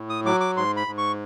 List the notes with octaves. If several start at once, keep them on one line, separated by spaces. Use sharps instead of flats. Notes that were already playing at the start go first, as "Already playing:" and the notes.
Already playing: A2
D#6
F#3 D6
D6
G#2 C6
B5
G#2
C#6